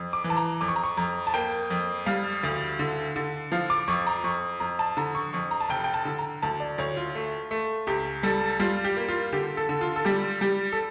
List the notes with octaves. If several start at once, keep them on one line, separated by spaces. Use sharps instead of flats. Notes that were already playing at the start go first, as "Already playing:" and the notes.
Already playing: F2
D6
E3
A5
A#5
F2 D6
C#6
A#5
C#6
F2 A#5
A5
A#3 G5
F2
G3 F5
D2
D3
D3
F3 F5
D6
F2 C#6
A#5
F2 C#6
F2 A#5
A5
D3 A#5
C#6
F2 C#6
A#5
A5
F1 G5
G5
A5
D3
A#5
D2 A5
D5
D2 C#5
F4
A3
A3
C#2 G4
G3 A4
G3 F4
G4
A#3
F4
D3 G4
A4
D3
F4
A4
G3 G4
G3 G4
A4